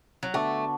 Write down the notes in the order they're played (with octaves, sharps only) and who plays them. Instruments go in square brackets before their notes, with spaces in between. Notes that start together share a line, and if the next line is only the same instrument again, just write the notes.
[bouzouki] F#3
[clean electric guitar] D3 B3 D4 F#4 [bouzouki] A3